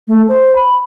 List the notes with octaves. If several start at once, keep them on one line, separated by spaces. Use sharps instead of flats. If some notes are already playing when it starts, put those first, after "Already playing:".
A3
C5
B5